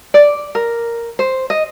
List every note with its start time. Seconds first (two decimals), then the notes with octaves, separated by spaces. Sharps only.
0.14 D5
0.55 A#4
1.19 C5
1.50 D#5